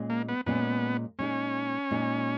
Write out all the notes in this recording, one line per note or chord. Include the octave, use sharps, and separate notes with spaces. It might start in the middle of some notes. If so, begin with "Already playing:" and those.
Already playing: A#2 G#3 C#4 G#4
A#3
B3
A#2 G#3 B3 C#4 G#4
A#2 G#3 C#4 D#4 G#4
A#2 G#3 D#4 G#4